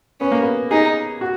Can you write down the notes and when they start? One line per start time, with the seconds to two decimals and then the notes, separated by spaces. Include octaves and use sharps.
0.21 B3 C#4
0.32 A#3
0.42 B3
0.71 D#4 G#4
1.21 F#4